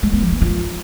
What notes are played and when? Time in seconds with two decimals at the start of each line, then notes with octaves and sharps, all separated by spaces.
0.03 G#3
0.12 B3
0.22 F3
0.32 A#3
0.42 F4